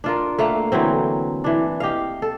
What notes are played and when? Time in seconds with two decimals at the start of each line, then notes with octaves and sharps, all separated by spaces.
0.04 D4 F4 A#4
0.38 A3 A#3 F5 F#5
0.72 D3 E3 F#3 C4
1.44 E3 D4
1.80 G4 D#5 F5
2.22 A4